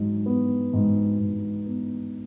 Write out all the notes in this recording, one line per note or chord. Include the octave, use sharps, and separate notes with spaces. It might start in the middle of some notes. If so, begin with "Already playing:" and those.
Already playing: G#2 F#3
B3
G#2
G#2
B3